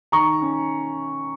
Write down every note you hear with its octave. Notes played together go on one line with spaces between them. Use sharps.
D#3 A#5 C#6
C#4